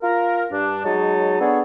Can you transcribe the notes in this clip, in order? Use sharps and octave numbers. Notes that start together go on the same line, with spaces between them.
F4 A#4
G2 D4
F#3 G#3 D#4 C#5 A5
B3 D4 G#4 A4 C#5